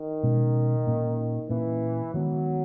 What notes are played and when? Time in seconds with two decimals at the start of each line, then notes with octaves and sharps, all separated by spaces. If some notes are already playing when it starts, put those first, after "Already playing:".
Already playing: D#3
0.23 B2 G#3 C#4
0.87 A#2 A#3 C#4
1.49 A#2 E3 A#3 C#4
2.14 D#3 F#3 G#3 B3